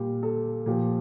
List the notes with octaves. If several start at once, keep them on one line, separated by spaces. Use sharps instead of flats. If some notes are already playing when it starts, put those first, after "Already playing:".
Already playing: A#2 G3 G4
A4
A#2 F3 G4